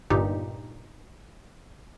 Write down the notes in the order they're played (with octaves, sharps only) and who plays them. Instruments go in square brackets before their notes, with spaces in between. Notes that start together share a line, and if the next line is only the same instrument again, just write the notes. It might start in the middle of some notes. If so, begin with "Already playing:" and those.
[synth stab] G1 G2 A#2 D#4 G4